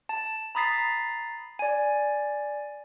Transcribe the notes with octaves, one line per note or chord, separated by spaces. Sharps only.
A5
A#5 B5 D#6 A6 B6 C7
D5 G#5